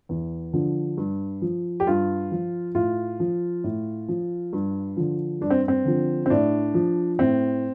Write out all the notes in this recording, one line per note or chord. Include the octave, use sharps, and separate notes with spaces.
E2
D3 F3
G2
F3
G4
G2 F4
F3
A2 F4
F3
A2
F3
G2
D3 F3
G2 D4
C4
C4
D3 F3
C4
A2 D4
F3
A2 C4